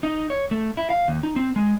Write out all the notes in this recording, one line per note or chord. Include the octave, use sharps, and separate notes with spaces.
D#4
C#5
A3
E4
F5
D#2
D#4
C4
G#3